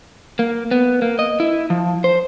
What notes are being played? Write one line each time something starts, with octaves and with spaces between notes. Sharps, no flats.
A#3
B3
A#3
D#5
E4
F3
C5